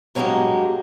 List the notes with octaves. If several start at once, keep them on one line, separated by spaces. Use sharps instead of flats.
G2 F#3 G#3 A#3 G4 D#5